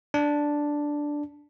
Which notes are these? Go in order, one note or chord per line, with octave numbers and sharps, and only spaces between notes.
D4